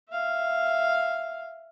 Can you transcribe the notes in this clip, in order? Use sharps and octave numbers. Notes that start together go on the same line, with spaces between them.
E5 F5